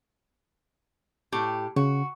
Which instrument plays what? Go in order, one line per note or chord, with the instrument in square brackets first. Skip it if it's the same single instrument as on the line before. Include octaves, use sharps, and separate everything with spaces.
[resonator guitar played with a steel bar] A2 G4
[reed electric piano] C#3 [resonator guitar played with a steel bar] F#4